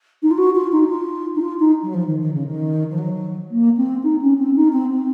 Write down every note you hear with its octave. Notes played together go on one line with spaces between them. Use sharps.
D#4
F4
F#4
F4
D#4
F4
D#4
F4
D#4
F#3
F3
D#3
D#3
C#3
D#3
F3
F#3
A#3
C4
D#4
C#4
C4
D#4
C4
C4